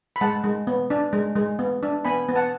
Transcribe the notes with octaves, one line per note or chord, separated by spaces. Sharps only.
B5
G#3 F#5 A5
G#3
B3
D4
G#3
G#3
B3
D4
B3 G#5 B5
B3
F#5 A5